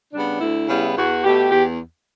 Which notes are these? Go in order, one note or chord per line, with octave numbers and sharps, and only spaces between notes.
C#3 G3 B3 D4
D2 E4
C#3 G3 B3
E2 F#4
B2 A3 G4
E2 G4